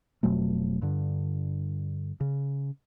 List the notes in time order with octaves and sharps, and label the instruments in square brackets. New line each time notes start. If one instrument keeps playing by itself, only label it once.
[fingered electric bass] F1 B2 F#3 A3
G2 D3
C#3